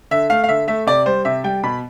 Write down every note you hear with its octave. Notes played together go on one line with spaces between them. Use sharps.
D3 E5
A3 F5
F5
D3 E5
A3 E5
C3 D5
G3 C5
C3 E5
G3 G5
B2 B5